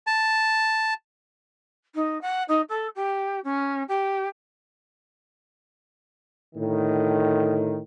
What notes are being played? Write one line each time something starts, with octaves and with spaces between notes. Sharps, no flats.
A5
D#4
F#5
D#4
A4
G4
C#4
G4
A2 D3 D#3